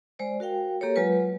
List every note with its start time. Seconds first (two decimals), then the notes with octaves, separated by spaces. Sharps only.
0.19 G#3 C5 D5
0.40 F#4 A#4 F5 G5
0.81 A#3 G4 A4 A#4 C#5
0.96 F#3 G#3 F4 B4